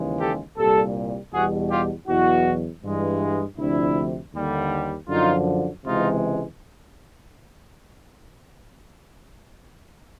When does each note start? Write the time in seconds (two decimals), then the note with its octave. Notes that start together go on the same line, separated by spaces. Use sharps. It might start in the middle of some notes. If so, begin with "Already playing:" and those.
Already playing: D#2 C#3 E3 G#3
0.19 G4 A4
0.56 C2 A#2 G3 G4 A4
1.32 E2 B2 G3 F#4 G#4
1.69 F4 G4
2.07 E2 B2 F#3 E4 F#4
2.83 G2 E3 G#3
3.58 D2 C3 F3 D4 E4
4.34 D#2 D3 G3
5.09 F#2 D3 F3 D#4 F4
5.84 C#2 C3 E3 G#3 D#4 F4